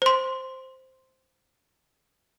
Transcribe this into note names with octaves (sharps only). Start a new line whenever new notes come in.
C5 C6